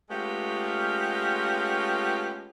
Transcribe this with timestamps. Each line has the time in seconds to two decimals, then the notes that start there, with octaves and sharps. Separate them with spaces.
0.10 G#3 A3 B3 C#4 F4 G4